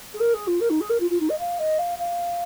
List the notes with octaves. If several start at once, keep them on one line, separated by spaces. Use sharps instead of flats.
G#4
A#4
G#4
F4
A#4
D#4
G#4
A#4
F4
F4
D#4
D#5
F5
D#5
F5
F5